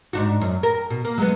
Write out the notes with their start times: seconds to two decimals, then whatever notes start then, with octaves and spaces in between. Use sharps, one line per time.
0.13 G#2 D4 F#4
0.41 F#2
0.63 A#4
0.90 B2
1.05 A#3
1.18 F#3 G#3 B3